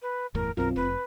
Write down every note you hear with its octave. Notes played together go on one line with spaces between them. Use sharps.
B4
F#1 E2 A2 A#4
B1 F#2 C4 F4 A#4
F1 B4